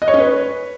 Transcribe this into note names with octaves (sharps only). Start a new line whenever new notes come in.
D#5
C#5
C#4
B4